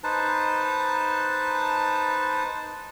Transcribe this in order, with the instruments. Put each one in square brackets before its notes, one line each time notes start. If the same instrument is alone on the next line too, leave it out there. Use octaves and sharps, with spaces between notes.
[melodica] D#4 B4 C5 A5